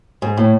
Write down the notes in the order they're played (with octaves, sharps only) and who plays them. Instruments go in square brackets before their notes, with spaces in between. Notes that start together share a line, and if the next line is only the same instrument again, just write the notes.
[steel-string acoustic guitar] G#2
A2